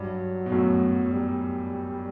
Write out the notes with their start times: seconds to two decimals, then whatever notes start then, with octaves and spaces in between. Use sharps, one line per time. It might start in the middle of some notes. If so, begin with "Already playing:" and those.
Already playing: G2 F#3
0.46 B2
0.52 F#2 A2
1.12 G3